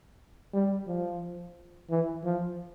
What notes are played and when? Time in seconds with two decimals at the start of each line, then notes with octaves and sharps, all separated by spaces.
0.54 G3
0.87 F3
1.90 E3
2.24 F3